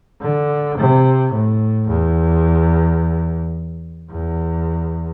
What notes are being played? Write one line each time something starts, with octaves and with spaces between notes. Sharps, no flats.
D3
C3
A2
E2
E2